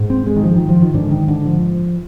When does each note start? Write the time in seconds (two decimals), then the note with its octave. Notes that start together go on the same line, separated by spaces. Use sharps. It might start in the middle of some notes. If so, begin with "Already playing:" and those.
Already playing: G#2
0.10 C4
0.27 G#3
0.36 D#3
0.44 F3
0.56 D#3
0.69 F3
0.82 D#3
0.94 G#2 D3
1.11 D#3
1.28 D3
1.46 F3